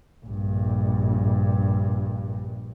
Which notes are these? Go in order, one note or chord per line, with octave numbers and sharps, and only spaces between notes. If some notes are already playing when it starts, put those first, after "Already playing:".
A#1 G2